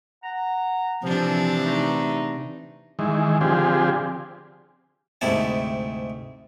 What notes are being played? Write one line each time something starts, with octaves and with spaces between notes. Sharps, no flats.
F#5 A#5
C3 E3 F3 D4
E2 A3 D#4
D#3 E3 G#3
D3 F3 C4 G4 G#4
D2 G#2 C3 E4 A5